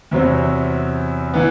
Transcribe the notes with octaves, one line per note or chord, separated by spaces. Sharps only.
E2 C3 F#3 C4
E3 B3